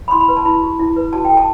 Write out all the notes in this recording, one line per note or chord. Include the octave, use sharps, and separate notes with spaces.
B5
E4 C6
B5
B4
A5
E4 B5
G4
E4
B4
F#4 A5
G5
A4
A5